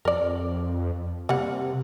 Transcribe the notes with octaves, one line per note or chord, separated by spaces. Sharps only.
F2 A#4 D5
C3 G3 A#3 F#5